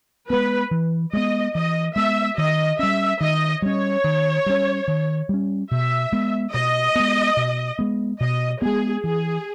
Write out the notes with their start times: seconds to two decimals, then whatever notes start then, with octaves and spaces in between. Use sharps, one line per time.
0.30 G#3 B3 B4
0.71 E3
1.13 G#3 B3 D#5
1.55 E3 D#5
1.96 G#3 B3 E5
2.38 D#3 D#5
2.79 G3 C#4 E5
3.21 D#3 D#5
3.62 G3 C#4 C#5
4.04 D#3
4.46 G3 C#4
4.88 D#3
5.29 G3 C#4
5.71 B2 E5
6.13 G#3 B3
6.54 B2 D#5
6.96 G#3 B3
7.37 B2
7.79 G#3 B3
8.21 B2 D#5
8.62 G#3 B3 G#4
9.04 E3 G#4